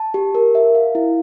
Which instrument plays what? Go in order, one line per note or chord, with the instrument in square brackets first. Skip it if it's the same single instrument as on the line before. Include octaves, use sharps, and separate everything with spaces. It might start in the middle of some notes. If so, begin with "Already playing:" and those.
Already playing: [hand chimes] A5
G4
A#4
E5
F5
E4